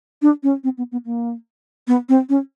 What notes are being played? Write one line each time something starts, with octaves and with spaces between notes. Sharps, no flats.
D4
C#4
C4
B3
B3
A#3
B3
C4
C#4